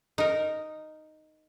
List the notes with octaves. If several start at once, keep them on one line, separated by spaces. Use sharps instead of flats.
D#4 A#4